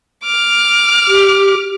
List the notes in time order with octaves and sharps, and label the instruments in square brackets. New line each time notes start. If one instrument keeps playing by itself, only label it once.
[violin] D6 F6
[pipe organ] G4